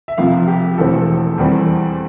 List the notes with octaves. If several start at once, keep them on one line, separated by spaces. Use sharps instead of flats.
E5
F1 F2 C3 F3 F5
G4
E1 E2 E3 A3 C4 A4
E2 E3 G3 C4